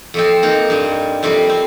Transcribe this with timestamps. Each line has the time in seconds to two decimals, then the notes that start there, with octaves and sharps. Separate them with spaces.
0.14 F2 F3 C4
0.43 A#3 D#4
0.70 G2 G3
1.23 F2 C3 G3 C4
1.49 C4